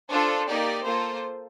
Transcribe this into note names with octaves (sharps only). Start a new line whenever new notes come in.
D4 F4 A4 C5
A#3 D#4 G4 D5
A#3 F4 A4 C5